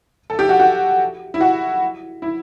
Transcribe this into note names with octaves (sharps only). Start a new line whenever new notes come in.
A4
G4
F#4
F#4
E4
F#4
E4